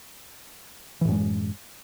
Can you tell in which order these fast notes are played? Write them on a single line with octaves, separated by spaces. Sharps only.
E3 A2 F#2 G#3